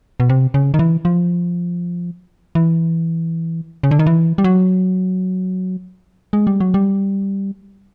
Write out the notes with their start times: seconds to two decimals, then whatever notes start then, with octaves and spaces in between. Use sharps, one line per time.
0.20 B2
0.29 C3
0.54 C#3
0.74 D#3
0.79 E3
1.05 F3
2.55 E3
3.83 C#3
3.91 D3
3.99 D#3
4.06 E3
4.38 G3
4.44 F#3
6.33 G#3
6.47 G3
6.60 F#3
6.74 G3